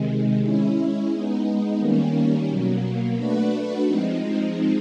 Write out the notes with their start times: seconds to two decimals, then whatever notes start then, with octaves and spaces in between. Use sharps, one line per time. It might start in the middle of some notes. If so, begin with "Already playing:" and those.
Already playing: C3 D#3 G#3
0.41 G#3 C#4 E4
1.10 G#3 B3 D#4
1.79 D#3 G3 A#3 C#4
2.48 B2 F#3 A#3
3.16 A3 D4 F#4 B4
3.85 F3 G#3 C4 D#4